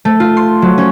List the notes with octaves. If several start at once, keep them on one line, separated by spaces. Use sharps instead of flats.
A3
F4
C6
F#3
C#4